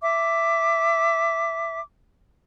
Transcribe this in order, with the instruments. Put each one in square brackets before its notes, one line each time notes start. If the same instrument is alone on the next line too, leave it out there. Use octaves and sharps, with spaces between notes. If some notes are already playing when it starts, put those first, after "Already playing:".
[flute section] E5 D6